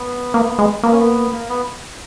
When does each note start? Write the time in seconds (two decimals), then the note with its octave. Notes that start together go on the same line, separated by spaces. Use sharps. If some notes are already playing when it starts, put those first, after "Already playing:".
Already playing: B3
0.34 A#3
0.59 G#3
0.83 A#3 B3
0.91 C#4
0.99 B3
1.33 A#3
1.49 B3